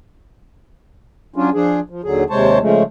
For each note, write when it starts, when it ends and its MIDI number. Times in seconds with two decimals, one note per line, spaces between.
1.36 1.50 54
1.36 1.50 61
1.36 1.50 62
1.36 1.50 65
1.54 1.80 53
1.54 1.80 62
1.54 1.80 68
1.90 2.02 53
2.04 2.24 39
2.04 2.24 50
2.04 2.24 54
2.04 2.24 68
2.30 2.59 39
2.30 2.59 48
2.30 2.59 56
2.30 2.59 72
2.30 2.59 73
2.30 2.59 81
2.60 2.83 49
2.60 2.83 53
2.60 2.83 56
2.60 2.83 57